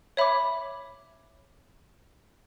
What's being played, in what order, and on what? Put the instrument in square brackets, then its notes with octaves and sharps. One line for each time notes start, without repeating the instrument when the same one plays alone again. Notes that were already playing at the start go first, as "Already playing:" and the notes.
[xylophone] C#5 E5 B5 D6